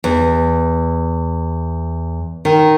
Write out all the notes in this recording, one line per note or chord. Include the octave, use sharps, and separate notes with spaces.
E2
D#3